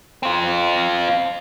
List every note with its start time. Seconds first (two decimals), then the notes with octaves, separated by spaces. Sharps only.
0.23 C4 F4